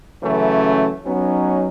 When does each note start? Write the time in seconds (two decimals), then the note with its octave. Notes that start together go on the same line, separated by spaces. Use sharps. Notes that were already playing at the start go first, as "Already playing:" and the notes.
0.22 C#3 E3 F#3 A3 C#4
1.06 F#3 B3 C#4 D#4